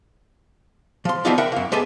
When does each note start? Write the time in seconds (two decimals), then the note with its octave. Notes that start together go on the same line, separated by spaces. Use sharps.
1.05 F3 C6
1.25 E3 F3 G3 B3 D#4 F4
1.38 A#4 E5 F#5 G5 B5
1.52 F#2 A#3
1.72 G#3 B3 G4 A4 G#5